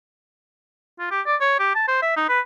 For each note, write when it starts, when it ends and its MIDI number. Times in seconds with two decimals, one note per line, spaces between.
0.99 1.11 65
1.11 1.21 67
1.26 1.36 74
1.41 1.55 73
1.59 1.72 67
1.75 1.86 81
1.88 2.02 72
2.02 2.12 76
2.16 2.28 63
2.29 2.40 71